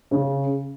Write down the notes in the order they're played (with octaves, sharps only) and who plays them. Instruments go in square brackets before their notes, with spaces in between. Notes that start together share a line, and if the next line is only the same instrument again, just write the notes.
[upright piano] C#3